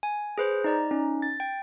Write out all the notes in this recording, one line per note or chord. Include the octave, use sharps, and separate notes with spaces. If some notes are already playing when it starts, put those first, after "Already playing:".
G#5
G#4 B4 C5
D#4 D5 A#5
C#4 D#4
A6
G5